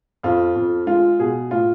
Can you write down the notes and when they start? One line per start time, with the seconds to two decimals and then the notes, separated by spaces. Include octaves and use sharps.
0.23 F2 F4
0.55 F2
0.87 G#3 F4
1.19 B2 G#4
1.51 A2 F4